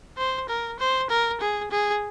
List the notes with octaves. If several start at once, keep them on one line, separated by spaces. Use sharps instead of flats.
C5
A#4
C5
A#4
G#4
G#4